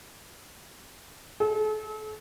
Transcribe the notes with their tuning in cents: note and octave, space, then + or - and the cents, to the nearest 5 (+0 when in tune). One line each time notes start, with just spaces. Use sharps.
A4 -40